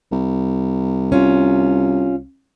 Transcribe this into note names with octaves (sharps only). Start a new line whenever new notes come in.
C2
C#4 F4